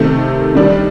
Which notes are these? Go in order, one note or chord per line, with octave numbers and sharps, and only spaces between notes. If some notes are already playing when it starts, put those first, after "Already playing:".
Already playing: C3 D#3 A3
D#3 G3 D4